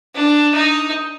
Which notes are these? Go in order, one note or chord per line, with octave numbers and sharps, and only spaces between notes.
D4
D#4